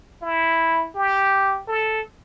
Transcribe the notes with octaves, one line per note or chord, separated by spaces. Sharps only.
E4
G4
A4